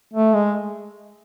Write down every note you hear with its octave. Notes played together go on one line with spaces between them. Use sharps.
A3
G#3